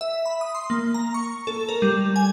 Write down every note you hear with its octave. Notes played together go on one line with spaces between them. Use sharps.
E5
B5
D#6
C6
A#3
A#5
C#6
A4
A#4
G3
G#5